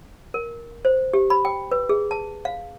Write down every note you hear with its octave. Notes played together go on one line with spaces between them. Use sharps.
A#4
C5
G4
B5
G5
B4
G#4
A5
F5